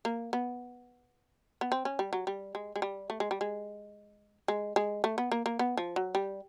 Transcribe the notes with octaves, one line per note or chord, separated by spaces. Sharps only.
A#3
B3
B3
C4
C#4
G3
F#3
G3
G#3
G#3
G3
A3
G#3
G3
G#3
G#3
G#3
A3
B3
A#3
A#3
B3
F3
F#3
G3